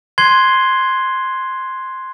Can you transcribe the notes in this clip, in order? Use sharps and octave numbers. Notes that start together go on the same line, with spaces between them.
C6 F#6 G#6 C7 D#7 G7